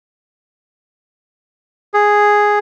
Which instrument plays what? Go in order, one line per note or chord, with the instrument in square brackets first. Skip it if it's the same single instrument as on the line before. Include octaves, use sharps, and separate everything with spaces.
[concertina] G#4